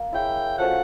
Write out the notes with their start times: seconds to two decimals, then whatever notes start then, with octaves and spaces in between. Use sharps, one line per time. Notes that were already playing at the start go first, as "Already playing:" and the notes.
Already playing: A#3
0.12 E4 G#4 C#5 F5 G5
0.58 F3 A3 C#4 F#4 F#5